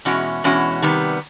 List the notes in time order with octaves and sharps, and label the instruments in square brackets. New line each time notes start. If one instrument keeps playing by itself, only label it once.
[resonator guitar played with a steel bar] E2 B2 G#3 C#4 F#4
E2 B2 G#3 C#4 F#4
C3 D#3 G3 B3